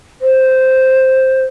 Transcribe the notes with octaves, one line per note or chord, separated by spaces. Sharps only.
C5